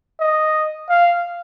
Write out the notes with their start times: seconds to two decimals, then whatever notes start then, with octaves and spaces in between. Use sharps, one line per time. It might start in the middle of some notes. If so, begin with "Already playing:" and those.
0.20 D#5
0.89 F5